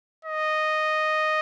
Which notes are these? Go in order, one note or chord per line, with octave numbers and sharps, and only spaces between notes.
D#5